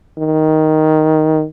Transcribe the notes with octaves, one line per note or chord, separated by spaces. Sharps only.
D#3